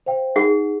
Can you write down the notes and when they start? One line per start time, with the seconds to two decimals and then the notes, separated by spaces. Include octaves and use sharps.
0.06 C5 F5 G5
0.36 D#4 G#4 F#5